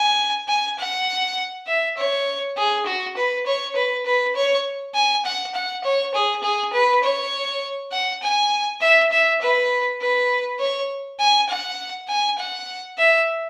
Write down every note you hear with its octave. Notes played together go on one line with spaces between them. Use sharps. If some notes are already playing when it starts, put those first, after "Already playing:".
Already playing: G#5
G#5
F#5
E5
C#5
G#4
F#4
B4
C#5
B4
B4
C#5
G#5
F#5
F#5
C#5
G#4
G#4
B4
C#5
F#5
G#5
E5
E5
B4
B4
C#5
G#5
F#5
G#5
F#5
E5